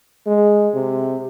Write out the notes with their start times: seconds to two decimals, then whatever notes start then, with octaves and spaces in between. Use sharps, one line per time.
0.26 G#3
0.74 C3